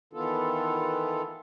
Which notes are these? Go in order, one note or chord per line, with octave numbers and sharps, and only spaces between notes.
D#3 E3 B3 F4 A4